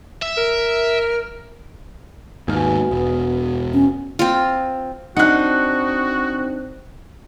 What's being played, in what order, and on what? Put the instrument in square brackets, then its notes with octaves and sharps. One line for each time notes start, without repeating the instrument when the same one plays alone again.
[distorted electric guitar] E5
[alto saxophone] A#4
[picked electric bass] D#2 G#2 [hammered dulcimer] B2 F5 G#5
[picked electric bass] E1 [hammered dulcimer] B3
[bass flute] C#4
[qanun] C4 F4
[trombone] C4 [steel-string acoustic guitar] D4 D#4 [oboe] F#4 [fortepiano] F#5 F#6